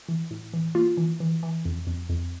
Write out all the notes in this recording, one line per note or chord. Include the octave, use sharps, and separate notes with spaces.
E3
A2
E3
A#3 F4
E3
E3
E3
F2
F2
F2